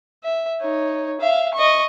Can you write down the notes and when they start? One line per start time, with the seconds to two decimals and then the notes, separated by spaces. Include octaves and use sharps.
0.24 E5
0.61 D#4 C#5
1.21 E5 F5
1.54 D#5 C#6